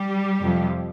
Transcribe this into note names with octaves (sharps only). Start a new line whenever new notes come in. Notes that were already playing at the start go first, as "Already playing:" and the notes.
Already playing: G3 G4
F2 C3 F3